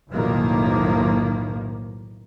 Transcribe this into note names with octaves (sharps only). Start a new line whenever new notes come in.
F#1 B1 A2 D#3 F3 A#3